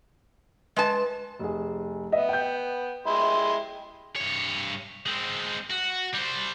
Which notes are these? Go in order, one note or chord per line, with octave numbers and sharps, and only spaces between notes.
G#3 B4 A5
F1 G#4
B3 D#5 E5
G5 G6
G#3 E4 C6
G2 C#5
G#3 C4
F#4
G3 C5